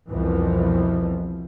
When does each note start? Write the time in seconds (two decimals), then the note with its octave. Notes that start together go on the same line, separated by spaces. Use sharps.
0.10 C2 F2 B2 E3 F3